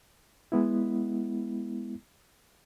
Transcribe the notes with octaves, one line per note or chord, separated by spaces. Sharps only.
G#3 B3 E4